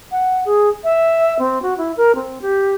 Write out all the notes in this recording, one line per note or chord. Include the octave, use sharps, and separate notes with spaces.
F#5
G#4
E5
C4
F#4
E4
A#4
C4
G4